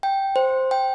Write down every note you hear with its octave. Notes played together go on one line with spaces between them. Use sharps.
G5
C5
G5